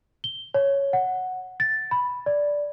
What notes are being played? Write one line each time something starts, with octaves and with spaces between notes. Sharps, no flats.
G7
C#5
F#5
A6
B5
D5